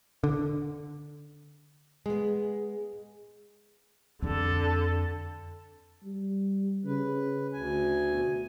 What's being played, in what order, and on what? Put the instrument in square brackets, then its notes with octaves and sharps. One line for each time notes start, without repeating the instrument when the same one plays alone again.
[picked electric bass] D3
[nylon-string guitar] G#3 B3 [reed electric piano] G#4
[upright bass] F2 C4 [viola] D3 A4
[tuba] G3
[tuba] C#3 [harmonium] B4
[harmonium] D2 G#5
[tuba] B2